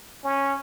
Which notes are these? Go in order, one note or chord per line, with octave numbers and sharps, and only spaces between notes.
C#4